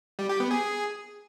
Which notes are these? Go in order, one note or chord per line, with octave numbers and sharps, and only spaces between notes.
G3
G4
B3
G#4